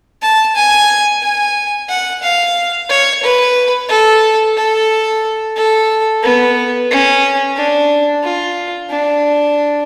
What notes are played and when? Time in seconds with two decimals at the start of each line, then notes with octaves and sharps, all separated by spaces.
0.22 A5
0.56 G#5
1.22 G#5
1.89 F#5
2.22 F5
2.89 C#5
3.23 B4
3.89 A4
4.57 A4
5.57 A4
6.23 B3
6.90 C#4
7.57 D4
8.23 F4
8.90 D4